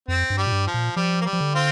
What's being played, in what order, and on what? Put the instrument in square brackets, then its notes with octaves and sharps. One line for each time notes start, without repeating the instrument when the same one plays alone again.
[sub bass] F2 [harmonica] C4
[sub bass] G2
[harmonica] G3
[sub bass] A#2
G2
[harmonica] F3
[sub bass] A#2
[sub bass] F3 [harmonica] G3
[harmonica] A#3
G3
[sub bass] F3
D3
[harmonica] C4 F4